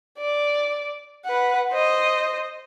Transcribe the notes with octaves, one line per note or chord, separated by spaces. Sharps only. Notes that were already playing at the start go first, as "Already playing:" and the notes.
D5
B4 F#5
C5 D#5